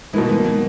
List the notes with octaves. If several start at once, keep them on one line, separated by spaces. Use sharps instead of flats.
B2 E3 G#3 A#3 D#4
E3 G#3
D#3 F#3